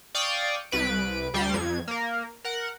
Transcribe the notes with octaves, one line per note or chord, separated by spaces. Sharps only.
D5 F5 G5 C#6 D#6
C2 B4 D7
D2 G3 G5 A6 C7
F2 G#6
A#3 A#4
A#4 F#5